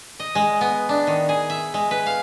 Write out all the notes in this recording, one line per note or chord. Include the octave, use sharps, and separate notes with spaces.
D#5
G#3
B3
D4
D#3
G#4
E5
G#3
B4
F5